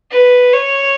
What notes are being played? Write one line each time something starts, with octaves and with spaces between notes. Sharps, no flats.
B4
C#5